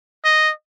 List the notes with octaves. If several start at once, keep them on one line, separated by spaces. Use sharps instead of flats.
D#5